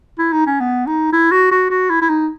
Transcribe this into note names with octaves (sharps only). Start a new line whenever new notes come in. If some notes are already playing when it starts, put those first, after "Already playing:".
E4
D#4
C#4
B3
D#4
E4
F#4
F#4
F#4
E4
E4
D#4